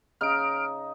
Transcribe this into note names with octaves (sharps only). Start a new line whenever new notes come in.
C#3 D#4 F6 D7